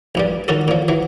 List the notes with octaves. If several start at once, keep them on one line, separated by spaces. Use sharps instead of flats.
A#1 G2 G3
D#3 C#4 F#4 A4
A#2 F3
E3 F#3